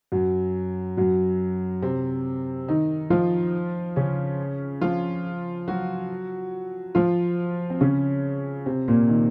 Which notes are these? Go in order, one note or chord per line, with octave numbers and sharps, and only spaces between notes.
F#2 F#3
F#2 F#3
C3 C4
D#3 D#4
F3 F4
C#3 C#4
F3 F4
F#3 F#4
F3 F4
C4
C#3 C#4
C3 C4
A#2 A#3
D#3